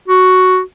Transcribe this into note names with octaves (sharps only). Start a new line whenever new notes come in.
F#4